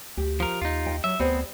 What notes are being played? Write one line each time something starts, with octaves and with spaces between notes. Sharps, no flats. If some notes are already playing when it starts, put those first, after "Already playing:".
D2 G4
F3 A#4
D#2 D#4 F4
D#5 G5
F#3 E5
D2 B3 C4 G#4 C5 D5